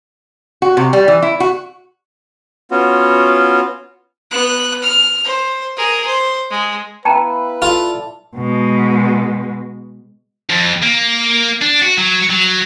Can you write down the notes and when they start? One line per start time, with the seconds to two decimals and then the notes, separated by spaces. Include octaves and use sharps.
0.62 F#4
0.77 C3
0.93 G3
1.08 E3
1.22 E4
1.40 F#4
2.71 B3 C#4 F4 F#4
4.31 B3 F#6
4.83 F6
5.24 C5
5.77 G#4 A#4
6.06 C5
6.50 G#3
7.05 B3 E4 B4 F5 G5 A5 A#5
7.62 F4 A4 D5
8.36 B2 G#3
10.50 F2
10.83 A#3
11.61 D4
11.82 F#4
11.97 F#3
12.29 F#3